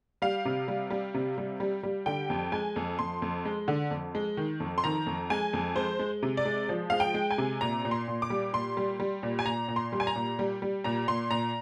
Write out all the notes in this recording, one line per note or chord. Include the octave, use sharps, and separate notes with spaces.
G3 F5
C3
G3
G3
C3
G3
G3
G3
D3 G5
F2
G#3 G#5
F2
F2 C6
F2
G#3
D3
F2
G#3
D#3
F2
C6
D#3 A#5
F2
G#3 G#5
F2
G#3 C5
G#3
C3
D5
G#3
F3
G#3 F5
G5
G#3
G#5
C3
A#2 A#5
A#2
C6
A#2
D6
G3
A#2 C6
G3
G3
A#2
G#5
A#2 A#5
A#2
C6
G3
G#5
A#5
A#2
G3
G3
A#2 A#5
A#2 C6
A#2 A#5